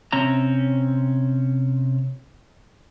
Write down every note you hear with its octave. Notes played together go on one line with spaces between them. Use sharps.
C3 C4 C#4 A#5